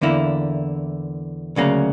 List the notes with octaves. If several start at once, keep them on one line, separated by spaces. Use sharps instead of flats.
E2 D3 A#3 E4
D2 C#3 F#3 A#3